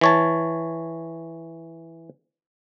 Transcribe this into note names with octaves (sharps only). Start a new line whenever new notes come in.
E3 C#5 A5